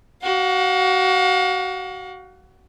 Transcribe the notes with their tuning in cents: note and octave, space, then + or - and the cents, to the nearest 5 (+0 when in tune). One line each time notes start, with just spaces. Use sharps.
F#4 +25 F5 +45